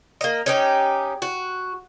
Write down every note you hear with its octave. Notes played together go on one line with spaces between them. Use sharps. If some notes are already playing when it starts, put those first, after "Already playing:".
A#3 D#5
C#4 D#4 G4
F#4